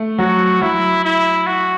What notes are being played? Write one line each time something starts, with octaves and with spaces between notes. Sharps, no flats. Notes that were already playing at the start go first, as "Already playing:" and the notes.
Already playing: A3
F#3 F#4
F#3 E4
E4
F#4